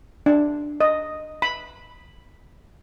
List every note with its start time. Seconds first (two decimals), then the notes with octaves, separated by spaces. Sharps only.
0.26 D4
0.81 D#5
1.42 B5